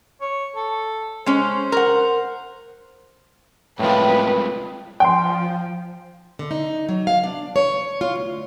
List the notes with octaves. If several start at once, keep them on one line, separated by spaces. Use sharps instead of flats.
C#5
A4
G#3 C#4 C5
A#4 F#5
C2 A2 F3 G#3 B4 G5
F3 G5 C6
D3
D#4
F#3
F5
D4
C#5
F4
D2